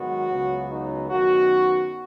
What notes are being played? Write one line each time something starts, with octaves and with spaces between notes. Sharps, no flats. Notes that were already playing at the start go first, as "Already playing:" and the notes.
Already playing: G#2 D#3 F#3 B3 F#4
C#2 C#3 F#3 B3
D#4
F#2 D#3 B3 F#4